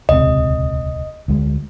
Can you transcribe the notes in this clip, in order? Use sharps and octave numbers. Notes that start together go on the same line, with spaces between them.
D#1 C#2 C3 D#5
D2 G#3